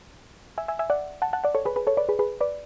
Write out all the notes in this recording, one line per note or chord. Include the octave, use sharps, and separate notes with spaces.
E5 G#5
E5 G#5
E5 G#5
D5 F#5
F#5 A5
F#5 A5
D5 F#5
A4 C#5
G#4 B4
G#4 B4
A4 C#5
B4 D5
G#4 B4
G#4 B4
B4 D5